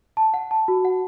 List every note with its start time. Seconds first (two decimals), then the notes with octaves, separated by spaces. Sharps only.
0.17 A5
0.34 F#5
0.51 A5
0.68 F#4
0.85 F#5